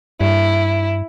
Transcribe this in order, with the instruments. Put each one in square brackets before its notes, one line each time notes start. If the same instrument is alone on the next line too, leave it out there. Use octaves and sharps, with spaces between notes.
[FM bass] G2 [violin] E4